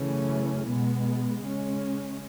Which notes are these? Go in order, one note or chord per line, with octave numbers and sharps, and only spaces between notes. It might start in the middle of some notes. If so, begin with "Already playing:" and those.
Already playing: F#2 C#3 E3 A3 C#4
B2 G#3 B3
C#3 G#3 C#4